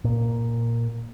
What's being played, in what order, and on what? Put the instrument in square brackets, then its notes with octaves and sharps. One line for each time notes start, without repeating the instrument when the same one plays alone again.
[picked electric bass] A#2